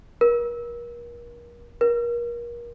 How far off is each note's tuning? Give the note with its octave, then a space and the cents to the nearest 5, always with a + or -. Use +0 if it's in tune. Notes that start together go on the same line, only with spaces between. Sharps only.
A#4 +40
A#4 +30